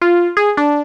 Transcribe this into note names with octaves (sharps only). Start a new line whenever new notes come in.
F4
G#4
D4